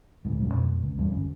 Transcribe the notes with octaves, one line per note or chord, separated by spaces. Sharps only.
D1 G#2
E1 B1 F#2 A#3
F2 B2
C#2
E2 G2
G1 F#2